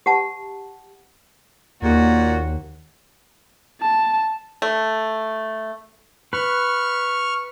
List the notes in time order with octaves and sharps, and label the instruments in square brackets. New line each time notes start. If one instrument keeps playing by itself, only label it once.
[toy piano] G4 F#5 A5
[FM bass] D#2 [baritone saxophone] A#2 [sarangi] F#4
[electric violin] A5
[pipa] A3
[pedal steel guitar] B4 [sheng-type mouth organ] C#6 F6